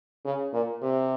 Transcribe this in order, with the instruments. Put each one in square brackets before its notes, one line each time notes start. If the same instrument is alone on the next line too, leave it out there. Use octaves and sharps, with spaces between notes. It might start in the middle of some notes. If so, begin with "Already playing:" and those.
[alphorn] C#3
A#2
C3